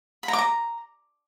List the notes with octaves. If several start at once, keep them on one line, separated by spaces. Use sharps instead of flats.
B5
A#5
D6
A#5